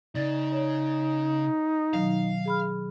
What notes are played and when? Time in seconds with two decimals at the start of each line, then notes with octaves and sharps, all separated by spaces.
0.15 C#3 D#4 D5 A6
0.52 C#5
1.94 B2 D#3 F#3 F5
2.45 G#4 B5 F6